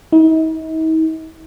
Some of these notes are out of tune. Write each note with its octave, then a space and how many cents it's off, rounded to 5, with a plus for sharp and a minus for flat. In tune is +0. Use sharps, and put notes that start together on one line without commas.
D#4 +45